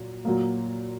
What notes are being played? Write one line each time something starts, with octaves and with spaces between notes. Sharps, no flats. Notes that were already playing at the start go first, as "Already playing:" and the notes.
Already playing: A#2 F#3
A#2 F#3 A#3